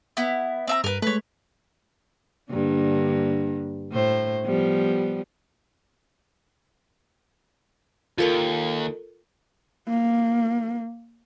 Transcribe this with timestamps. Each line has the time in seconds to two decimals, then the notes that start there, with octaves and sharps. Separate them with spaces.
0.17 B3 E4
0.67 C4 E5 A#5
0.84 G2 A#4 B4
1.02 G#3 A3 B4 C#5
2.51 G2 D3 A#3
3.92 A2 C5
4.45 F3 G3 B3
8.18 D#2 F4 A4 A#4
9.88 A#3